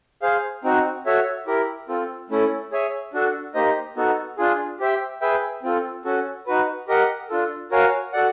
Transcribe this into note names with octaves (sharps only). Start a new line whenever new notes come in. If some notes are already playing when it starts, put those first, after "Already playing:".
G#4 C5 F5
C4 D#4 F#4
F#4 A4 C#5 E5
E4 G4 A#4
C4 F4 A4
A3 C#4 E4 A4
G#4 C#5 E5 G#5
D4 F#4 A4
A#3 D#4 G4 C5 D#5
B3 D#4 F#4 A4
D4 F4 G#4
G4 C5 E5 G5
G#4 B4 E5 G5
C4 F4 A4
C#4 F#4 A4
D#4 F#4 B4
G4 A#4 D#5 F#5
D4 F4 A4
F#4 A#4 C#5 F5 G#5
F#4 A4 D5 F#5